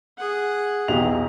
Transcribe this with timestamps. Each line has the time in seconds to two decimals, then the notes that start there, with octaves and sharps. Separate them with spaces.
0.19 G#4 F#5
0.88 B1 E2 G4 F7